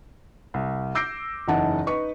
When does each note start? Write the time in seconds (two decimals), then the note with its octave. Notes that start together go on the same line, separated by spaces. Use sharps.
0.54 C2
0.95 D6 E6 G6 A#6 C7 D7
1.48 F#1 E2 E3 D#4 F#5 A5
1.86 D#4 B4 C#6